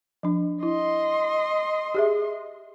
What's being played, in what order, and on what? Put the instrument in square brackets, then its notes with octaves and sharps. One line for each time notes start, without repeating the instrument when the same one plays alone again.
[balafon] F3 D4
[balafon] E4 [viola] D#5 C6
[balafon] G4 G#4 E5